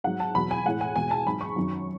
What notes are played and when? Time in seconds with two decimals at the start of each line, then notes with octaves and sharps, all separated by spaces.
0.04 G#2 F#3 F#5
0.20 A5
0.35 E2 B2 F#3 B5
0.51 G#5
0.65 A2 E3 G#3 F#5
0.81 G#5
0.95 E2 B2 G#3 G#5
1.11 A5
1.26 G#2 F#3 B5
1.41 C#6
1.56 F#2 D#3 F#3